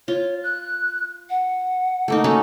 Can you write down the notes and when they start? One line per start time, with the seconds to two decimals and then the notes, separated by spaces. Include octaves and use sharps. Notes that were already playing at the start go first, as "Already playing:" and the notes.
0.08 F4 C#5
0.44 F#6
1.30 F#5
2.08 A3 A#3 D#4
2.24 A3 C#4 F#4